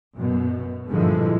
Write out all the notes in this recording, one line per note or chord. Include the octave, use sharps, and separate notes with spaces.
F#2 B2
G2 A#2 D3 E3 F3 G#3